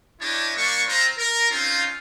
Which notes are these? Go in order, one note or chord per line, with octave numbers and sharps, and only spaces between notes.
D4 E4 G4 C#5 D#5 A5
G3 A#3 D4 C#6
C4 F4 A#5
A#4
C4 C#4 D#4 F4